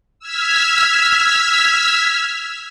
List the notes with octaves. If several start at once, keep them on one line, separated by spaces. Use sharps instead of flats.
E6 F6 G#6 B6